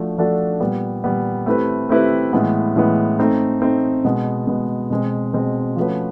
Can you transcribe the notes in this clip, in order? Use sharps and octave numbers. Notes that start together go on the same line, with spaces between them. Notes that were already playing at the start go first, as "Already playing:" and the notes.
Already playing: F3 A3 D4 F#4 A4
F3 A3 D4 F#4 A4
A#2 G3 B3
A#2 G3 B3
A3 C4 E4 G4 B4
A3 C4 E4 G4 B4
A2 E3 G#3 B3
A2 E3 G#3 B3
A3 C4 D#4
A3 C4 D#4
B2 G#3 B3
B2 G#3 B3
B2 G#3 C4
B2 G#3 C4
F3 A3 C#4 F#4 B4